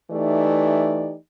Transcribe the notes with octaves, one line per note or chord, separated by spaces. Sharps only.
E3 A3 D#4 G4 D5